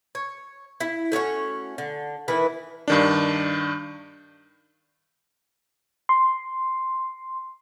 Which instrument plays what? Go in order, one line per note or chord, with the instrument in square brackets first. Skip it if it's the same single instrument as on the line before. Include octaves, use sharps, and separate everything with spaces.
[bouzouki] C#5
E4
A3 C#4 F#4 C#5
D3
D#3 E3 E4 B4
[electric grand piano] G2 D#3 D4
[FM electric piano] C6